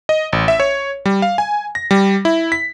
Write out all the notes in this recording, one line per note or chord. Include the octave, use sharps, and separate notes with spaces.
D#5
A1
E5
C#5
G3
F5
G#5
A#6
G3
E4
B6